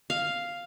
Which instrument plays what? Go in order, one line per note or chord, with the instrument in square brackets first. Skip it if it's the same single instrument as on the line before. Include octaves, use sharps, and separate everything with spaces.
[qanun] F5